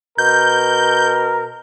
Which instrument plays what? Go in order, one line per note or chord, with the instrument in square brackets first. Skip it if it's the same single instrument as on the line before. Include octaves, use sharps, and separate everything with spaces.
[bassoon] B2 [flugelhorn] A#4 [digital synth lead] G6